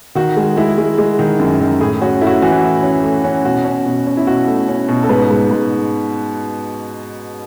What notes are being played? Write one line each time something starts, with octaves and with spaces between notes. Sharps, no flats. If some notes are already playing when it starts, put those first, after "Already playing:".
D#3 F#4
G#3
G#3 E4
G#3
G#3
D#3
F#2
D#3
A2 G#4
C#4 F#4
A3 E4
F#4
E4
E3 F#4
E4
A2
C#4
A3
C#4
B2 F#4
C#4
B2
C#4
E4
B2 F#4
A3
C#4
B2
A4
G#2 B4
G#2
G#2